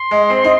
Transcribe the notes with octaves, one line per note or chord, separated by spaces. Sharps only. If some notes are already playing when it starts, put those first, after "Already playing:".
Already playing: C6
G#3
C4
D#4